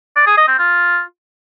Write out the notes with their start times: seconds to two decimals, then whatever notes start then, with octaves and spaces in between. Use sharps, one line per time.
0.16 D5
0.27 G#4
0.37 D#5
0.48 C4
0.58 F4